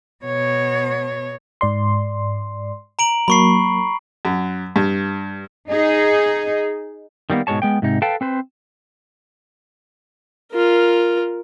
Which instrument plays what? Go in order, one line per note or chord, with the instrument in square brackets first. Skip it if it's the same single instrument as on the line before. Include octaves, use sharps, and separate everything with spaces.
[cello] B2 C#5
[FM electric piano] G#2 D5 C6
[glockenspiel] A#5 D7 F#7
[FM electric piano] F#3 A#3 [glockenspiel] B5 C#6 C7
[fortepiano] F#2
G2
[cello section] D#4 G#4
[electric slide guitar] D#3 G3 A#3 B3
G#2 B2 G#3 C#5 A5
G#3 B3 G5
G#2 C3 D#4
A4 B4 F5 G5 A5
C4 B4 C5
[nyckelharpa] F4 A#4